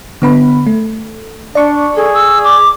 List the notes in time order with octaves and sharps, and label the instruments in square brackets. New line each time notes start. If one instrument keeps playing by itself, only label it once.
[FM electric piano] D3 B3 B5
A3
[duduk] D4 [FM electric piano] D5 C#6
[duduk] G#4 [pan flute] A4
[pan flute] E6
D6